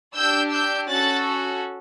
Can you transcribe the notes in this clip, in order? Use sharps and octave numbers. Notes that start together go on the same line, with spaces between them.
D4 G4 E6 G6
E6 G6
C#4 F#4 A4 F#6 A6